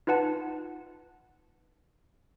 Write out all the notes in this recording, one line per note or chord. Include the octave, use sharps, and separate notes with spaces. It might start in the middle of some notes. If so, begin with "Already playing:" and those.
D#4 F4 B4 F#5 A5